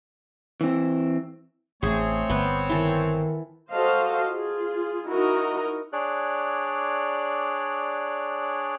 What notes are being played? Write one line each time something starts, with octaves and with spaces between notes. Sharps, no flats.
E3 C4
A1 A3 C4 G#4 C#5
G1 B3
D#3 E3 A4
F#4 A4 C5 D#5 F5
F4 G#4
D#4 E4 F#4 A#4 D#5
D4 G#4 C#5 D5 F#6